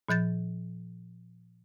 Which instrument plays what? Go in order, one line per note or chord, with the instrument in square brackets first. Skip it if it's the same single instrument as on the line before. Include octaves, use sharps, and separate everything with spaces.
[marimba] A#2 F3 G6 A6